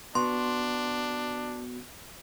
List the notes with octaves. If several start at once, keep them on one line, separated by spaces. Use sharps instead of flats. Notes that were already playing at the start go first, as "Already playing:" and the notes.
B3 D4 F#4 C6